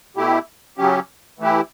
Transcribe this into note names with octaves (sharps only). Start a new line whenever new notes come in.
B2 A3 E4 G4
C#3 F#3 C#4 G4
E3 A3 E4 G4